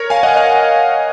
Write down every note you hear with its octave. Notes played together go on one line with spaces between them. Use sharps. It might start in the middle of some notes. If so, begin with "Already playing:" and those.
Already playing: A#4 C#5
F5 G#5
D#5 F#5
F5 G#5